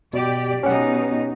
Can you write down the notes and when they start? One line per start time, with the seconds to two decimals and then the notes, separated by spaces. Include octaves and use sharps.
0.13 B2 G4 D5
0.63 B2 C#4 D#4 G4 F#5